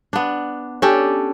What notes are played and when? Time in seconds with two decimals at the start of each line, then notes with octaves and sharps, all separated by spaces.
0.13 B3 D4
0.82 C#4 D4 G4 A4